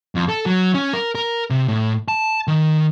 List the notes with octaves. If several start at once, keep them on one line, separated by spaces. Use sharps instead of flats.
F2
A4
F#3
C#4
A#4
A#4
C3
A2
A5
D#3